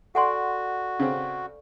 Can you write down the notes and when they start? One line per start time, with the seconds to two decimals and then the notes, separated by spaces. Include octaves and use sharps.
0.15 F#4 A4 D5 F#5 G#5 C6 C#6
1.00 C#3 C4